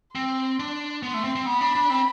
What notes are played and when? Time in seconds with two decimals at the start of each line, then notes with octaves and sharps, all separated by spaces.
0.15 C4 C6
0.60 D4
1.03 B3 C6
1.14 A3
1.24 C4
1.35 C4
1.46 B3 B5
1.61 D4
1.75 D4
1.90 C4